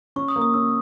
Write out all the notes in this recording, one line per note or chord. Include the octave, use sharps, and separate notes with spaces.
C#4 C#6
D#6
A#3
D#6
C#4 E6